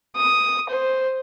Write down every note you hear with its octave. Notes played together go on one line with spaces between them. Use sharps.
D#6
C5